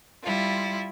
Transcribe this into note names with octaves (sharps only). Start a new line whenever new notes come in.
G3 E4 F4